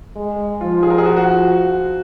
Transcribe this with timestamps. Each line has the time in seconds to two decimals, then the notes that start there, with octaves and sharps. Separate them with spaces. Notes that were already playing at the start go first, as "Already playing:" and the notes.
0.16 G#3
0.61 F3 F4
0.83 G#4
0.90 A#4
0.98 G#4
1.05 F#4
1.17 F#4